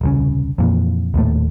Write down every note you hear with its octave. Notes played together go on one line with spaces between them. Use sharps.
D#1 C2 C#3
F2 A#2 E3
D#1 D#2 A2 A3